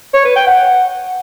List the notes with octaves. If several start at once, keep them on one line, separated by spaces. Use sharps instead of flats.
C#5
B4
G5
F#5